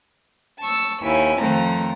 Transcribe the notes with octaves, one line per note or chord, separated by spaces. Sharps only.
A5 C#6 E6
D#2 E4 G#5
F2 D#3 F3 A3 A#5